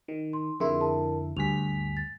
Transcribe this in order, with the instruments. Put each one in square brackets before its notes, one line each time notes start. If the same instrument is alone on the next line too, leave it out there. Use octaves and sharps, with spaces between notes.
[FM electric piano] D#3
[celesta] C6
[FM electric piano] F2 D3 E4 [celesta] G#4 A#4 C6
[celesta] A#4 A5
[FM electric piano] D2 G2 B6 [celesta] G#5 F7
[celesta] A6